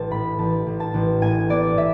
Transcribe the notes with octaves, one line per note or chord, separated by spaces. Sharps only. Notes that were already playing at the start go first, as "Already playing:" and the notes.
Already playing: A1 A5
A2 B5
A1 A5
A1
A5
A1
A2 G#5
B3 D5
A2 E5